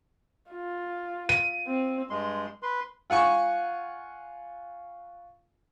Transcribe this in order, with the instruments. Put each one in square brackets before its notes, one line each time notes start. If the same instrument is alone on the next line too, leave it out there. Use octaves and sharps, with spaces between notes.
[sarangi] F4
[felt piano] D#7
[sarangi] C4
[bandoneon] G2 G#3 C6
B4 C6
[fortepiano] F4 F#5 G#5 C#6